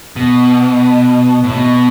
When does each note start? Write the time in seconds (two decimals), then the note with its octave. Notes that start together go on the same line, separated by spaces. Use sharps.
0.16 B2
1.44 A2
1.54 B2